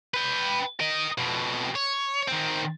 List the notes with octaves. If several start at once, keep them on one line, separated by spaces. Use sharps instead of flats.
B4 G5
A#4 D#5
F2 B2
C#5
D#3 C4